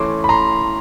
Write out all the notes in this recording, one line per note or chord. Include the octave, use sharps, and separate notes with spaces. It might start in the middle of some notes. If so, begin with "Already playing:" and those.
Already playing: E3 A3 C#4 C6 D6
B5
A#5 C6